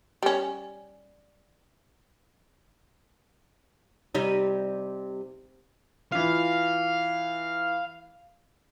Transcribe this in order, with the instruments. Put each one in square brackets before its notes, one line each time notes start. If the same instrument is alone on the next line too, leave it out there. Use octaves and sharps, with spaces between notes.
[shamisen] G3 C#4
[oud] C3 G3 D#4
[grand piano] E3 F4 [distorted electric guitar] F5